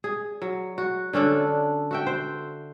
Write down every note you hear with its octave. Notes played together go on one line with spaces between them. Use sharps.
G#4
F#3
F#4
D3 C#4 D4 A4
F#4 E5 G5
C5